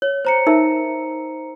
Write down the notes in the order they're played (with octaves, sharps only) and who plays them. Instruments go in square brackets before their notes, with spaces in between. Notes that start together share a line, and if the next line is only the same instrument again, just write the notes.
[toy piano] C#5
[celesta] C5 A#5 C#7
[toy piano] D#4 A#4 E5